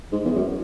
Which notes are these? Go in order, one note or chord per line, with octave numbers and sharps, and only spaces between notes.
G#2
E2
F#2